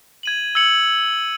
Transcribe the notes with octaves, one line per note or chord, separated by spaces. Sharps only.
G#6 D#7 F#7
E6 G#6 C#7 F#7